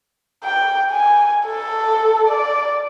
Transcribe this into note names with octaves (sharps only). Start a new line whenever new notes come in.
G5
G#5
A4
D5